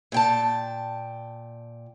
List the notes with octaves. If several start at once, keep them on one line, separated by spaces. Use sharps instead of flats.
A#2 G5 A5